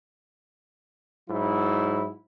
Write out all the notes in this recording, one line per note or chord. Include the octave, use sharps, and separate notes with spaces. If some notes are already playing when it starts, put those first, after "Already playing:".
G#2 F#3 E4